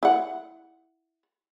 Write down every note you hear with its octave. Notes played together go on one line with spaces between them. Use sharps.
E4 F#5